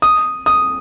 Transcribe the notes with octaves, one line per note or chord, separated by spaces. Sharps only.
D#6
D#6